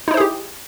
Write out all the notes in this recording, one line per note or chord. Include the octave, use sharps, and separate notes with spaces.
D#4 E4 G4 G#4 C5